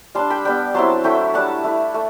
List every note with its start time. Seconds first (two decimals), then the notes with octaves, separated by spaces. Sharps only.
0.15 G3 D4 A5 C6
0.30 G5 B5
0.45 G3 B3 D4 G5 B5
0.74 F#3 C4 E4 A5 C6
1.04 F#3 A3 E4 G5 B5
1.34 G3 D4 F#5 A5
1.64 A3 E4
1.94 A3